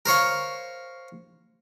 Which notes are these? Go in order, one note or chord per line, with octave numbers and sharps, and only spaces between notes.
A#4 C5 C#5 F5